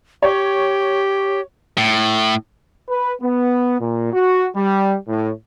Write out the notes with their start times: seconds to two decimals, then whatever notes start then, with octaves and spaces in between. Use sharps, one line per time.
0.22 G4 C#5
1.78 A2
2.89 B4
3.22 B3
3.80 A#2
4.13 F#4
4.55 G3
5.07 A2